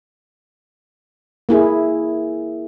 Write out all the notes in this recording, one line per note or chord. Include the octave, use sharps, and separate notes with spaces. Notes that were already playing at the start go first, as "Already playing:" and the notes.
A#3 E4 G#4